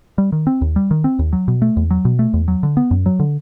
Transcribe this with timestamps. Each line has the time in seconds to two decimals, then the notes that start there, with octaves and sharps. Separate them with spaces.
0.18 G3
0.32 D#3
0.47 C4
0.62 D#2
0.76 G3
0.91 D#3
1.04 C4
1.19 D#2
1.33 F#3
1.48 B2
1.62 A3
1.77 E2
1.91 F#3
2.05 B2
2.19 A3
2.34 E2
2.48 F#3
2.63 D3
2.77 B3
2.91 F#2
3.06 F#3
3.20 D3